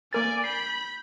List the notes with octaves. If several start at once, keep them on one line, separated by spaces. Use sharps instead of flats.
A#3 A#4 D5 G#5 A6
B5 G6 C7